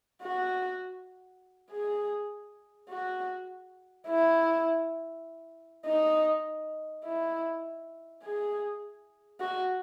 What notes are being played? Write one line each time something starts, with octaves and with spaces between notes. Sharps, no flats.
F#4
G#4
F#4
E4
D#4
E4
G#4
F#4